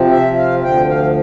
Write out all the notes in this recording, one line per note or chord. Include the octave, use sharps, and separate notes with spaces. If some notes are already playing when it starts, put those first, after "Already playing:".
Already playing: C3 F3 C4
E5
F5
D2 D3 F3 G5
F5